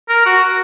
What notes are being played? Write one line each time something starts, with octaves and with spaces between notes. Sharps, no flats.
A#4
F#4